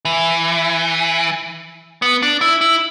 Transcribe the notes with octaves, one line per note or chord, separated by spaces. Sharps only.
E3
B3
D4
E4
E4